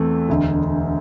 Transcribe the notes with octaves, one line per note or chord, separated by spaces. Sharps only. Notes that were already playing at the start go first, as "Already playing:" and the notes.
Already playing: E2 E3 A3 C4
E1 D2 D3